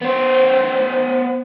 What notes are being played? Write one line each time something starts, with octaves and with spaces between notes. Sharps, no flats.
B3 C5